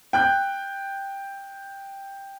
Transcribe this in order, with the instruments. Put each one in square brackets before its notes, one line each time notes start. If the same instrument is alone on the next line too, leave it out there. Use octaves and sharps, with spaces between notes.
[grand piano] G5 F#6 G6